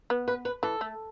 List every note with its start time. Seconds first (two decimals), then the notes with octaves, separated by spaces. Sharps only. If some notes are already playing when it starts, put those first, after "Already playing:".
0.10 B3
0.28 B4
0.45 B4
0.63 E3 A4
0.81 A3